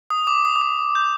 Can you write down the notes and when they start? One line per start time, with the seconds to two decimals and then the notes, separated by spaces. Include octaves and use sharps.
0.10 D#6
0.27 D6
0.45 D#6
0.56 D6
0.61 D#6
0.95 G6